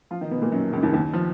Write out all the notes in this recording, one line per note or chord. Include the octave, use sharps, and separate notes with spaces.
F3 F4
D#3 D#4
B2 B3
A#2 A#3
F#2 F#3
C#2 C#3
D#2 D#3
D#2 D#3
F3